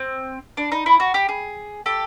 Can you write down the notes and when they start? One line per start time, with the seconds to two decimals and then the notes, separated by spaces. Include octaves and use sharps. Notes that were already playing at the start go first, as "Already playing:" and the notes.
Already playing: C4
0.57 D4
0.72 D#4
0.86 E4
1.00 F#4
1.14 G4
1.29 G#4
1.86 G4 A4